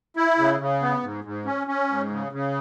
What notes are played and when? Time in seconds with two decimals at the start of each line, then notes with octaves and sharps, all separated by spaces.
0.16 E4
0.38 C#3
0.60 C#3
0.82 B3
1.03 G#2
1.24 G#2
1.45 C#4
1.67 C#4
1.88 G#2
2.11 C#3
2.32 C#3